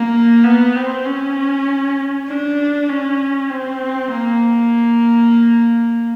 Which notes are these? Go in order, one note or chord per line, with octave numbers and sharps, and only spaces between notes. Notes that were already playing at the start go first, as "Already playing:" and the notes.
Already playing: A#3
B3
C4
C#4
D4
C#4
C4
A#3